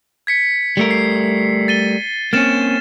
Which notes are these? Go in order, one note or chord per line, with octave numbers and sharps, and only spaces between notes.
G#6 B6 C#7
G3 A3 A#4
C7
A6 D#7 G7
A#3 C4 C#4 F6 A6 E7